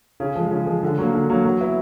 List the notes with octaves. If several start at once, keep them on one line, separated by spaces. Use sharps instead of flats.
C#3
F3 G#3
C#3
F3 G#3
D3
F#3 A#3
D3
F#3 A#3
F#3
B3 E4